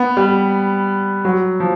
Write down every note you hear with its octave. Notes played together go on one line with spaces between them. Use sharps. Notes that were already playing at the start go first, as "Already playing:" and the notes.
Already playing: B3
G3
F#3
F3